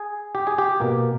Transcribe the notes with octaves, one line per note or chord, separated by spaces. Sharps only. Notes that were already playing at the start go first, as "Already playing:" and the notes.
Already playing: G#4
G4
G#4
G4
B2 A#3